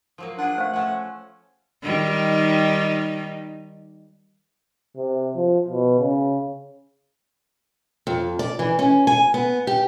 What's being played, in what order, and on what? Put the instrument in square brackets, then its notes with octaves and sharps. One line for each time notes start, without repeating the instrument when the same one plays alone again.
[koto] F3 F#3 A#3
[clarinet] D4 [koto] F4 G#4 [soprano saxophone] F#5
[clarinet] A3 [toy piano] C5 F5
[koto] F3 C#4 A4 [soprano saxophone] F#5
[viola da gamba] D#3 G3 D#4
[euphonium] C3
F3
B2
C#3
[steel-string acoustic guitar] F2
D5
E3
C#4
G#5
B3
G4